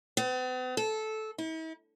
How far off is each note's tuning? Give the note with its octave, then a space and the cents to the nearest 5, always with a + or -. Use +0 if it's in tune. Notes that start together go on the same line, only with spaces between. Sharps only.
B3 +45
A4 -15
E4 -45